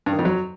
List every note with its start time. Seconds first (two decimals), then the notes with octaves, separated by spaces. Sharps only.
0.06 G2
0.13 D#3
0.19 F2
0.25 F#3